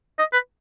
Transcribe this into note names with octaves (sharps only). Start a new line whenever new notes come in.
D#5
B4